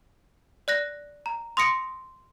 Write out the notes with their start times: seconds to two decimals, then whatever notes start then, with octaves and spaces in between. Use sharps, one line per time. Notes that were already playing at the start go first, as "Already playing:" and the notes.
0.68 D5 F#6 A#6
1.26 A#5
1.57 C6 D#6 A#6 C#7 D7